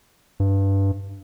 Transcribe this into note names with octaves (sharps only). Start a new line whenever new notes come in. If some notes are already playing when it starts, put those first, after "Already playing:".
G2